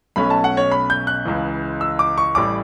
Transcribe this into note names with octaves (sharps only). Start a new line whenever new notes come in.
B1 B2 A3 C#4 B5
A5
F#5
C#5
B5
G6
F#6
C#2 C#3 E3
E6
D6
C#6
A1 A2 G3 D6